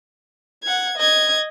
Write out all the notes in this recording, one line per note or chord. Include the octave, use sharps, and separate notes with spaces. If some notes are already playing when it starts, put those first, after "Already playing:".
F#5 G#6
D#5 G#6